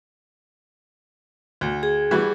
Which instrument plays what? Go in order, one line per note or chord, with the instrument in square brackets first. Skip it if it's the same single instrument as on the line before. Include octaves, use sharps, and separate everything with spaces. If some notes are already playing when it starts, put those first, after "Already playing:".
[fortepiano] D2
[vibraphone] G#4
[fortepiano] E3 G3 F#4